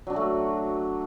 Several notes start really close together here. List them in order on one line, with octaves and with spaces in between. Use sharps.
F#3 D4 F#4 A3